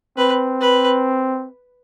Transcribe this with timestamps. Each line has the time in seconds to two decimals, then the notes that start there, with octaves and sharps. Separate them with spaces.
0.17 C4 B4
0.61 B4